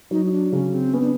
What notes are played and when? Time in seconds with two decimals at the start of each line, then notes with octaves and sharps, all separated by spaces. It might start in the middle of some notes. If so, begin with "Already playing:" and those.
0.11 F#3 D#4
0.25 D#4
0.32 D4
0.52 C#3 C#4
0.73 C4
0.93 B3 C#4
1.01 D4